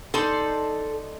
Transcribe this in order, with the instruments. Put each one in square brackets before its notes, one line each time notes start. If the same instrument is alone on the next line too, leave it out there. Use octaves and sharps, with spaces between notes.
[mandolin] D#4 D5 C6 [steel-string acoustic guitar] A4